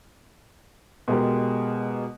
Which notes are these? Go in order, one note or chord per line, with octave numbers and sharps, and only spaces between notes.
B2 G#3 G4 A#4